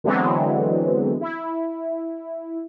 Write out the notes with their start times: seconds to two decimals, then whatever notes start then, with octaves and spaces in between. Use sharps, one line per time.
0.04 D3 E3 F#3 G#3 B3 C4
1.21 E4